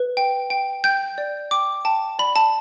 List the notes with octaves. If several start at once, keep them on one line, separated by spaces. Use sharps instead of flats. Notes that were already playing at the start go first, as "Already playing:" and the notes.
Already playing: B4
G5
G5
G5 G6
D5
G5 D6
G5 A5
D5 B5
A5